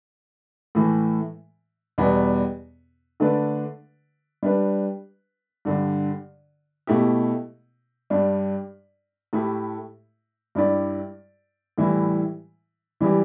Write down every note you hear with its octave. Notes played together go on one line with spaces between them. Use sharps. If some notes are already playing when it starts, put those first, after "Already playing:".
A2 E3 A3
E2 B2 G3 B3
D3 A3 D4 B4 D5
G3 D4 B4
G2 D3 G3
B2 A3 E4 G4
G2 G3 D4
A2 A3 E4 G4
G2 G3 E4 G4 D5
A2 E3 G3 E4
E3 G3 E4 G4